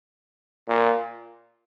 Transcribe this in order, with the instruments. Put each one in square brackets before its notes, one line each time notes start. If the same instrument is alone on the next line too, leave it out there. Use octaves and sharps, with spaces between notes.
[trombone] A#2